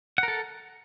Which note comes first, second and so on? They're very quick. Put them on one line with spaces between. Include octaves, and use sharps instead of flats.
F#5 A#4 A4